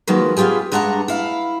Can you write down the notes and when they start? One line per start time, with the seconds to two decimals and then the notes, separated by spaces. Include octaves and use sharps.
0.07 D#3 F3 F#3 G#3 A#3 B3
0.37 B3 C#4 F4 G4 G#4
0.72 G2 G#3 D4 F#5 A5 A#5
1.08 E4 F5